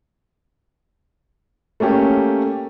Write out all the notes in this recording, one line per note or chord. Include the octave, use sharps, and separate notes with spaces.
A3 A#3 C#4 G4